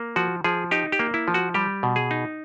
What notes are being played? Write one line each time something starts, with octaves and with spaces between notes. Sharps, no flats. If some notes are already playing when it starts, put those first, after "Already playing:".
Already playing: A#3
F3 F#4
F3 G#4
D#4 G4
G4
A#3
E4
F3
F#4
G3 G4
B2
G#4
D#4